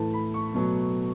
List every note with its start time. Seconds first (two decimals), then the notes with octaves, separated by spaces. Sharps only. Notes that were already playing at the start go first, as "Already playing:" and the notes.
Already playing: A2 E3 A3 A5
0.14 B5
0.34 C#6
0.55 B2 F#3 A3